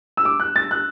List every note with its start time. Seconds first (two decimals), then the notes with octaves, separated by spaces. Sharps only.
0.17 E6
0.25 D6
0.40 F#6
0.56 A6
0.71 F#6